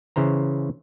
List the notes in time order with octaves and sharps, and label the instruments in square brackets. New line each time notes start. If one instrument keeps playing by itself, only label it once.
[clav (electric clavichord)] C#3 E3 C5 A#5